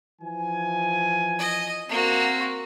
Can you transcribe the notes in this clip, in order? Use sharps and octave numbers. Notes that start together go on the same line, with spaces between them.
E3 F3 G#5
D#5
A#3 C4 F#4